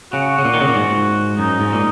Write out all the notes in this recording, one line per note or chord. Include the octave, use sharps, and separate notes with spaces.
C#3 F#4
C#3
A#2
D#3
C#3
A#2
G#2
F#2 D#4
G#2
A#2